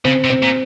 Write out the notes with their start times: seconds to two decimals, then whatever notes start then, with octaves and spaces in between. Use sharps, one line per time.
0.05 C#3 C4
0.24 C3
0.30 C4
0.43 A#2